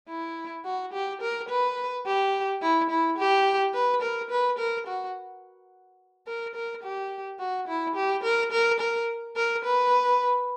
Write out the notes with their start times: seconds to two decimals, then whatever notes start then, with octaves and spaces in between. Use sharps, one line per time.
0.09 E4
0.65 F#4
0.93 G4
1.22 A#4
1.49 B4
2.06 G4
2.62 E4
2.90 E4
3.18 G4
3.74 B4
4.02 A#4
4.30 B4
4.59 A#4
4.87 F#4
6.27 A#4
6.55 A#4
6.83 G4
7.40 F#4
7.68 E4
7.96 G4
8.24 A#4
8.52 A#4
8.80 A#4
9.36 A#4
9.64 B4